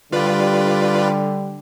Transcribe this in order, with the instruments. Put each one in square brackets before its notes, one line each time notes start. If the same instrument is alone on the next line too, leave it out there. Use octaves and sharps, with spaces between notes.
[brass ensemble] D3 G3 [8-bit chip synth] F4 B4 D5